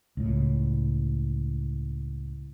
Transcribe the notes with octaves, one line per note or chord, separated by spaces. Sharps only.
C#2 A2